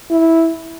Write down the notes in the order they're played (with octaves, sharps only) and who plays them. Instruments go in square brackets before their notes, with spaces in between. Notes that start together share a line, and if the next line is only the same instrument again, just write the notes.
[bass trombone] E4